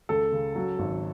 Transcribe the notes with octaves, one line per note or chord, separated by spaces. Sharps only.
C#2 A4
C#3
F#3
G#1